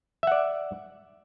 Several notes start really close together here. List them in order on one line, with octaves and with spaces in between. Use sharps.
E5 F#5 D5